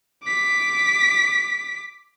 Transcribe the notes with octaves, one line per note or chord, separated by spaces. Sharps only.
D6 B6